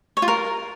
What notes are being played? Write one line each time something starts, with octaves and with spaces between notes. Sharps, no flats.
C#5
F4
A#4